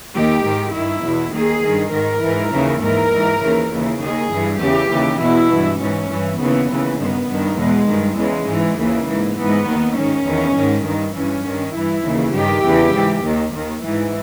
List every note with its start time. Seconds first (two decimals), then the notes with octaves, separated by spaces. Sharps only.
0.14 D#2 D#3 G4
0.44 G#2 D#3
0.74 G2 D#3 E4
1.03 E2
1.08 B2
1.33 D#2 D#3 G#4
1.63 G2 D#3
1.93 G#2 D#3 A#4
2.22 G#2 E3
2.53 D#2 C#3 E3
2.81 G#2 E3 A#4
3.12 G#2 E3
3.42 D#2 C#3 E3
3.71 D#2 C#3 E3
4.01 D#2 D#3 G#4
4.31 G2 E3
4.60 E2 C#3 E3 G4
4.90 D#2 C#3 E3
5.20 E2 B2 E4
5.50 G2 E3
5.79 G#2 E3 C#4
6.09 G2 E3
6.39 D#2 C#3 E3 B3
6.68 D#2 C#3 E3
6.98 G2 D#3 B3
7.28 G2 D#3
7.58 E2 B2 G#3
7.88 G2 D#3
8.17 E2 C#3 E3 G#3
8.47 G#2 E3
8.77 D#2 C#3 E3 A#3
9.06 G#2 E3
9.36 G#2 E3 B3
9.66 D#2 D#3
9.95 G#2 D#3 C#4
10.26 E2 D#3
10.55 G#2 D#3
10.85 G2 D#3
11.15 G2 E3 C#4
11.45 G2 D#3
11.74 G2 E3 E4
12.04 D#2 C#3 E3
12.34 G2 D#3 G4
12.64 E2 C#3 E3
12.93 G#2 E3
13.23 D#2 D#3
13.54 D#2 D#3
13.83 G#2 E3